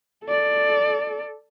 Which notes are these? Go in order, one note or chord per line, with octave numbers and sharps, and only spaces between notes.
A4 D5